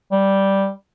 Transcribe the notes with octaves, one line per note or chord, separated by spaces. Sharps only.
G3